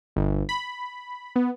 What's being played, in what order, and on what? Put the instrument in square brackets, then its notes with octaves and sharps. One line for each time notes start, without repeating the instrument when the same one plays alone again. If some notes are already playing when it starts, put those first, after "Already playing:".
[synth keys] G1
B5
B3